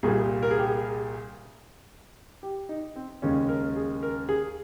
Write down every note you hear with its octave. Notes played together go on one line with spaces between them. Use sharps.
C2 A#2 G3 G#4
A#4
G#4
G4
G#4
G4
D#4
C4
D#2 C#3 G#3 C#4
A#4
G#4
A#4
G#4